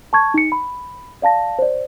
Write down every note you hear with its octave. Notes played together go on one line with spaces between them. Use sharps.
A5 C#6 G#6
D#4 C#7
B5
D5 F5 A5 A#6
C5 D5